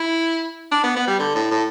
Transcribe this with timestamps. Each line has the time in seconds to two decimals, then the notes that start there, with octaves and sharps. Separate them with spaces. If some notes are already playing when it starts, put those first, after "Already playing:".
Already playing: E4
0.72 D4
0.84 B3
0.96 B3
1.07 G3
1.19 D3
1.35 A2
1.51 A2